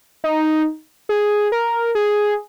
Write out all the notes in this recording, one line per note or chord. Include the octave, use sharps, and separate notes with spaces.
D#4
G#4
A#4
G#4